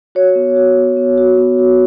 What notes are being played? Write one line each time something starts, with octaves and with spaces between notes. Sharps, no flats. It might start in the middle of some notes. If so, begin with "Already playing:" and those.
F#4 C#5
B3
F#4
B3
B3
F#4
B3
F#4